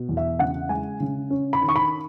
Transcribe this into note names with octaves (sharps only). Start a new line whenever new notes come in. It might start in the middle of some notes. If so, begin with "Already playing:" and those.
Already playing: B2
E2
E5
C#3 F#5
G#3 G#5
C#3
C#4
B5
D#3
C#6
B5